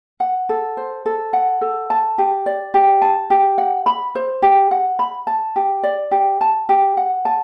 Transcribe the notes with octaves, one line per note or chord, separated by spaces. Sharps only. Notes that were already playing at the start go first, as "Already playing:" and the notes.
F#5
A4
C5
A4
F#5
A4
A5
G4
D5
G4
A5
G4
F#5
B5
C5
G4
F#5
B5
A5
G4
D5
G4
A5
G4
F#5
A5